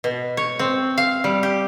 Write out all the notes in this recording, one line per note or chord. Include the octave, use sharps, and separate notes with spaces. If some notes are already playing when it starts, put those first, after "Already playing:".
B2
C#5
C4
F5
G3
G4